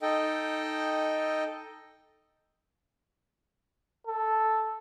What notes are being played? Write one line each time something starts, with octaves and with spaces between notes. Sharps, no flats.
D#4 A4 D#5 G5
A4